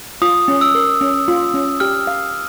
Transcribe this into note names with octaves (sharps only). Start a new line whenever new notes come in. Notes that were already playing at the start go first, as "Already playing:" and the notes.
F4 D#6
C#4
E6
A#4
C#4
F4
C#4
G4 F6
F5